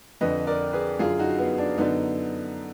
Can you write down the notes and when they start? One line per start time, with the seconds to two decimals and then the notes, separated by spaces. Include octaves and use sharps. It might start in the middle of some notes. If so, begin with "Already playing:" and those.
0.21 F2 D3 B4 D#5
0.47 A#4 D5
0.73 G#4 B4
0.99 F#2 D3 F4 G#4
1.19 D#4 F#4
1.38 B3
1.58 D4
1.78 F#2 D3 B3 D#4